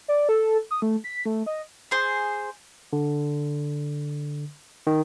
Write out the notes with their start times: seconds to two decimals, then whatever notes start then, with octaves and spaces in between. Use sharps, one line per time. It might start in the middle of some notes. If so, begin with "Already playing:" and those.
0.08 D5
0.29 A4
0.71 D#6
0.82 A3
1.04 B6
1.25 A3
1.46 D#5
1.91 G#4 C5
2.93 D3
4.87 D#3